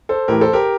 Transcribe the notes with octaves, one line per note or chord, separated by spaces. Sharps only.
A4 C5
A2 E3 G4 A#4
A4 C5
G4 A#4